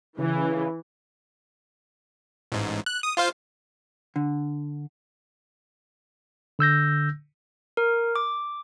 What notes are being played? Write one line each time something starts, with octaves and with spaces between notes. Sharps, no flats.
C#3 E3
A1 G#2
F#6
D#6
F4 C5 F5
D3
D3 E6 G6 A#6
A#4
D6